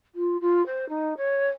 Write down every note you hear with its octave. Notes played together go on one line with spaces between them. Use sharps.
F4
F4
C5
D#4
C#5